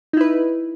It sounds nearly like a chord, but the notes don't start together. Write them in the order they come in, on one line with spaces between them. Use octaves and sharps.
D#4 E4 B4